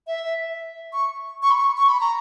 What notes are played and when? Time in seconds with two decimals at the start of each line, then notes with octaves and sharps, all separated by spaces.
0.07 E5
0.93 C#6
1.43 C#6
1.50 B5
1.58 C#6
1.77 C#6
1.89 B5
2.00 A#5